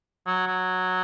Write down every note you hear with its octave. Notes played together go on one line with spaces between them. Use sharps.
F#3
F#3